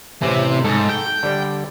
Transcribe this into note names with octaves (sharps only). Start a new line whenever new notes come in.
A1 C3 E3
G#2 A4
G5
D3 G3 D5